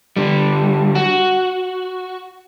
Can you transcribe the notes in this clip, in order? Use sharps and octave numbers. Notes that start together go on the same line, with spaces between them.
D3 G3
F#4